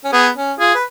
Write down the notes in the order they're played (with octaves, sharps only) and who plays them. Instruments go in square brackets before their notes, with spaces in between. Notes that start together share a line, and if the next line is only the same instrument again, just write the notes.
[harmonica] C#4
[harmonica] B3 [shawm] G#4
[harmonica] C#4
[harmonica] F4 [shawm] G#4
[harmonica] B4